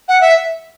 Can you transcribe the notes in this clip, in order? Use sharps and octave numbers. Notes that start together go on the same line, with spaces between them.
F#5
E5